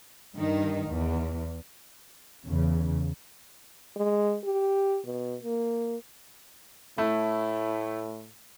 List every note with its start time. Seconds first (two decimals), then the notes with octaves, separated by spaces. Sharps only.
0.35 G2 D#3 D#4
0.90 E2
2.45 E2 C#3
3.96 G#3
4.44 G4
5.06 B2
5.42 A#3
6.98 A2 A3 E4